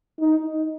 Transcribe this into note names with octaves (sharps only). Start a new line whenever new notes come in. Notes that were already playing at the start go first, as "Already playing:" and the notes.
D#4